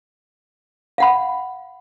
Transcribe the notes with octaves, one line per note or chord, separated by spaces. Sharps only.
F5 F#5 B5